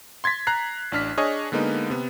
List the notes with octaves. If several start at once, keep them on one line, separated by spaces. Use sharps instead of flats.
C6 G#6 A6 B6
A#5 F#6 C7
A1 D4 F6 B6
D4 G#4 C#5 D#5 G#5
D3 G#3 A#3 B3 D#4
C3 B3